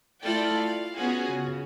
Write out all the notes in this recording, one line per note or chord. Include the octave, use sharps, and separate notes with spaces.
A3 E4 F4 A4 D5 G5
F5
B3 C#4 F4 F#4 G#4
C#3